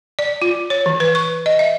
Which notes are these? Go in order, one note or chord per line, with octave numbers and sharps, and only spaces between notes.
D5
F4
C#5
E3
B4
C#6
D#5
E5